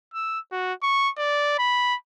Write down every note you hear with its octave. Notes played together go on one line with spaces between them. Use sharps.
E6
F#4
C#6
D5
B5